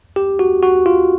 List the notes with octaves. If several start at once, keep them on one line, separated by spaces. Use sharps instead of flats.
G4
F#4
F#4
F4